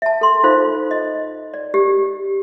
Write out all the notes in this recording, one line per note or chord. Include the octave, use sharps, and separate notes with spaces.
E5 A5
A4 C6
D#4 F4 A4 C5 F5
D#5
D5
G4